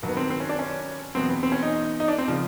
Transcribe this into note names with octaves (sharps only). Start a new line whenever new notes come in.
G2 D#3 F#3
B3
C4
C4
C#4
D4
C#4
E2 B2 F#3 C4
B3
C4
C#4
D#4
D#4
D4
C4
C#3 F3